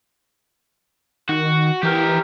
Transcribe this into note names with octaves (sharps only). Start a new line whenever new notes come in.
D#3 F#4
E3 G4 A#4